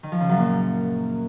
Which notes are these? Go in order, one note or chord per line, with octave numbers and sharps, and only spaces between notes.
D#3
F3
C#3
F#2
A#2